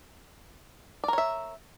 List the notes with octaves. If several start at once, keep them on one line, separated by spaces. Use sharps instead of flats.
A#4 C#5 D5 E5